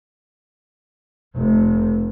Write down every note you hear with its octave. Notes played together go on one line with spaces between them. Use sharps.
F1 C3